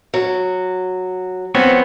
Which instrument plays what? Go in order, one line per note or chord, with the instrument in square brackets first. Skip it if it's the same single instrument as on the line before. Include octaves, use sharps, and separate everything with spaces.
[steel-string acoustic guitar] F#3
[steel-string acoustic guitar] F3 [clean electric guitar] B3 C4 C#5